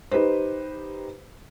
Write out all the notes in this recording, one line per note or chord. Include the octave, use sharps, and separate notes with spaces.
D#4 G4 B4 C5